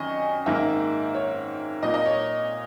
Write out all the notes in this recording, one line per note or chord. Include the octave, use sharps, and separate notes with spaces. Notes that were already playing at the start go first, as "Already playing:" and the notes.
Already playing: F#2 D#3 D#5 G#5 C#6
G#2 D#3 A#3 E5
C#5
A#2 A#3 D#5
D#5
C#5